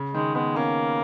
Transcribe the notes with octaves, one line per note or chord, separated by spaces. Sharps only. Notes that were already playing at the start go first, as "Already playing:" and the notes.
Already playing: C#3
D#3 G#3
G#3 B3
A#3 C#4